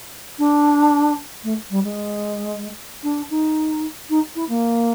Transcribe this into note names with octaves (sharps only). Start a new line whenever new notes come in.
D4
A3
G3
G#3
D4
D#4
D#4
E4
A#3